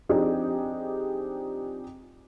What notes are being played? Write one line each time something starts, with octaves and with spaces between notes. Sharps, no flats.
F3 C4 D4 D#4 G4 G#4